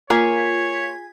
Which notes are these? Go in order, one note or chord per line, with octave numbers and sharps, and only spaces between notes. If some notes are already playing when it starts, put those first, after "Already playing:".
A#3 F4 G#4 A#4 C#5 G#6 B6